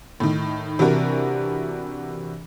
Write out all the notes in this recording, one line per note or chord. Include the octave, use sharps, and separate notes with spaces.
A2 D#3
C3 E3 D4 F#4 A#4